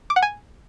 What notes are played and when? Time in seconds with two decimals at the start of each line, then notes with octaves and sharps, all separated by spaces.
0.10 D6
0.16 F#5
0.22 G#5